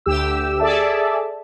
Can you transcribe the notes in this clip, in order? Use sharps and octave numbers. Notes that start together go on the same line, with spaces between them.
D2 G4 E6
G#4 A4 D5 E5 A5